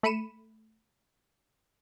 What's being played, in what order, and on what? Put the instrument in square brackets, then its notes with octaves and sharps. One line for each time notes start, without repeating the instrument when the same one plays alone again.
[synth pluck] A3 B5 C#7 D#7 E7